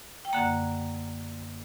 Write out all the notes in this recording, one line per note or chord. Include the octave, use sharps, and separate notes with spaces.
G5
F#2 D3 A#3 F#5 A#5